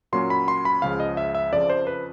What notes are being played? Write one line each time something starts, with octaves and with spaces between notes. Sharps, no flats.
A#2 F#3 A#3 C#4 C6
B5
C6
B5
C#2 C#3 F3 F5
D#5
E5
E5
F2 C#3 F3 D5
C5
B4